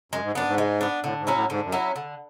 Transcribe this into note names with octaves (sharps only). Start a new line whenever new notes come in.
F#2 G#3
G#2
F#2 B3 D4
G#2
G#3
B3 D4
A2 D3
G#2
F#3 C#4 E4
A2
G#2 D3
F#2
F#3 C#4 E4
D3